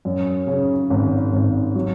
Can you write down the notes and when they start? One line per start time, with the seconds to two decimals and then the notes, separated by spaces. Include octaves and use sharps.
0.05 F#2
0.47 C#3
0.90 G#1
1.33 G#1
1.75 F#3